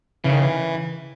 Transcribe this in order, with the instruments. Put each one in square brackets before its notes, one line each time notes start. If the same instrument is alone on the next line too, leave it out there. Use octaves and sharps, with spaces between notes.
[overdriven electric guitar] C#3 [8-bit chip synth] E3
[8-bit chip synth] D#3
E3